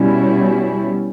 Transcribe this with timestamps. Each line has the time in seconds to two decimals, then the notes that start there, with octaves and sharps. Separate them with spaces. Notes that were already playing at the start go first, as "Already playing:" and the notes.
Already playing: B2 G3 C#4 E4